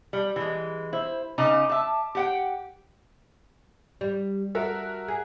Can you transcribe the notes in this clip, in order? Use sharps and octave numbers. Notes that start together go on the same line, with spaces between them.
G3
E3 G#3
E4 C5
C#3 D#4 A#5 D6
E5 A5
G4 F#5 G5
G3
F#4 A4 A#4 E5
G#4